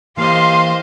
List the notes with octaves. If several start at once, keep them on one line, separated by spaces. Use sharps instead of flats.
E3 A#3 G4 C5 D#5 F5 C6